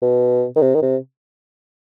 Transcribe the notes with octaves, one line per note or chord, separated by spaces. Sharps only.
B2
D#3
C3
D#3
C3